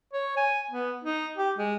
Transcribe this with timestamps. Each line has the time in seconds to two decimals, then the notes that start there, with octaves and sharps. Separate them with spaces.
0.13 C#5
0.37 G#5
0.71 B3
1.04 D#4
1.38 G4
1.58 G#3